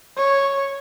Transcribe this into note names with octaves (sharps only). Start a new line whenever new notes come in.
C#5